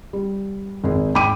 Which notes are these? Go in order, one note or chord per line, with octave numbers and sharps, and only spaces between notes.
G3
G#1 G#4
G#2 G5 B5 D6 D#7